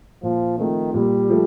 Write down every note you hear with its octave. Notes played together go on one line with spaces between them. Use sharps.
A#2 F3
D#3 F3 A3 C4
A#2 G3
F3 A3